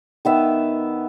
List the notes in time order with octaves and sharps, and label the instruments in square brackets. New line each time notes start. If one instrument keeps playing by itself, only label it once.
[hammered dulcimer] D#3 B3 E5